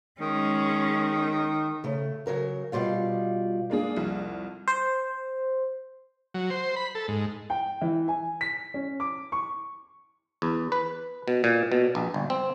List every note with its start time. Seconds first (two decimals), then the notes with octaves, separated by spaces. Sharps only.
0.21 D#3 G#3 C#4
1.84 C#3 A3
2.26 C#3 F#3 A#4 A#5
2.72 B2 G3 F4 F5
3.70 G#3 A#3 D4 G#4
3.96 C2 F2
4.68 C5
6.34 F#3
6.50 C5
6.76 B5
6.95 A4
7.08 G#2
7.50 G5
7.81 E3
8.08 G#5
8.41 B6
8.74 C#4
9.00 D6
9.32 C#6
10.42 E2
10.72 B4
11.28 B2
11.44 A#2
11.72 B2
11.95 A#1
12.14 G1
12.30 C4